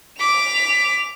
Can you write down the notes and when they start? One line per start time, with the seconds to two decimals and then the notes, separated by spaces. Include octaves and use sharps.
0.19 D6 B6 F7